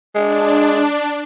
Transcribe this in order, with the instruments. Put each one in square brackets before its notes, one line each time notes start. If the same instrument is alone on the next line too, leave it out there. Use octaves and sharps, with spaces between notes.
[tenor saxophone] G#3 [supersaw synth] D4